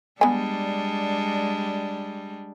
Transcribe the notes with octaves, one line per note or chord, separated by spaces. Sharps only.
G3 G#3 B3 D4 G#5